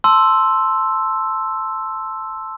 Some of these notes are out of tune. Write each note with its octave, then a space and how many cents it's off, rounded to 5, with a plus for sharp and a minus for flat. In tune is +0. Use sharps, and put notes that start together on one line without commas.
A5 +0 C6 +0 E6 +0